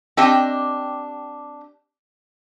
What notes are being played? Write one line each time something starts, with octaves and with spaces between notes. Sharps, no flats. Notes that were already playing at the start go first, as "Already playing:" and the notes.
C4 D4 G4 D#5 G5